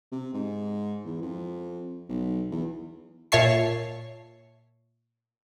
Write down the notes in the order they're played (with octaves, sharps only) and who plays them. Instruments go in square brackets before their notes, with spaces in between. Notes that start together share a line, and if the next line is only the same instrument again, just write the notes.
[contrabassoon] C3
G#2
E2
F2
B1
E2
[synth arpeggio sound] A#2 C#5 E5 A5 C#6 C7